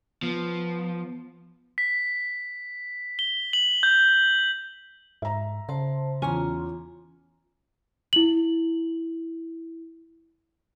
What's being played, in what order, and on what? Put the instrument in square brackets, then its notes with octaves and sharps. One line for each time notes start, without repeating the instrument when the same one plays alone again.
[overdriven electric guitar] F3 [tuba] B3
[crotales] B6
G7
F#7
G6
[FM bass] G#2 [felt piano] E5 A#5
[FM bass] C#3 [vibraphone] C5 A5 C6
[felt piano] E2 [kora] C#4 [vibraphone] F4 A#5 C6
[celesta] E4 F#7